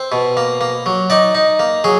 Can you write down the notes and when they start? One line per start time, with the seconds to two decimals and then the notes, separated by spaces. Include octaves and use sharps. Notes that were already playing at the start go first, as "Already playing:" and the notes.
Already playing: C4
0.12 B2
0.37 A#3
0.61 A#3
0.86 F#3
1.10 D#4 D5
1.35 D#4
1.59 A#3
1.84 F#3 G#4